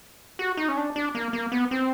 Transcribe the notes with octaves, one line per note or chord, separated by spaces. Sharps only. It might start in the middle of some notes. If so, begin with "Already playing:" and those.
F#4
D#4
C#4
D4
D4
A#3
A#3
B3
C4